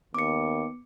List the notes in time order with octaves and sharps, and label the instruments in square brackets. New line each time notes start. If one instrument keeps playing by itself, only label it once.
[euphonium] D#2 [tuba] B3 [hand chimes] D6 C#7